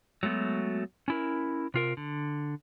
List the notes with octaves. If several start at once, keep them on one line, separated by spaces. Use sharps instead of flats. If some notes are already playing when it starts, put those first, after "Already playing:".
F#3 G#3 A3 B3 F#4
C#4 E4 A#4
C3 F4 A#4
D3